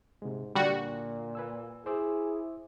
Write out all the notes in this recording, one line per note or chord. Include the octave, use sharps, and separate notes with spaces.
G#2 C3 G#3
A#2 D3 G3 F#4
B4 G#5 E6
E4 G#4 C5 D6 E6